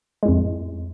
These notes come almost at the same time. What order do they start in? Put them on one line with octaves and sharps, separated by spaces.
G#3 A2 F2